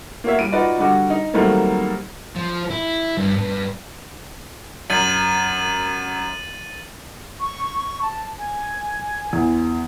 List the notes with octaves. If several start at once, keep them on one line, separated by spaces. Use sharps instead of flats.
A#3 F#4 C#5 E5
G3 D7 D#7
D#4 F4 F#4 B4 D5 D#5
D3 G3 F#4 D6
D#4
D#3 F#3 G3 A3 A#3 C4
F3
E4
G2
G2
F#2 A6 D#7 F#7
C#6
A5
G#5
E2